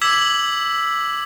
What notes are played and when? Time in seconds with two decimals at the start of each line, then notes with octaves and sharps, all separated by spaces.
0.01 D6 E6 G#6 B6 F#7